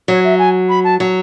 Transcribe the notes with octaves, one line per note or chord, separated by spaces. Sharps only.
F#3 C#5
E5
G#5
B5
A5
F#3